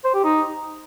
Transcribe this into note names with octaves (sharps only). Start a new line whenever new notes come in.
C5
G4
D#4